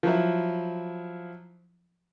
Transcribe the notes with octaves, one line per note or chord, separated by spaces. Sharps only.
F3 F#3 E4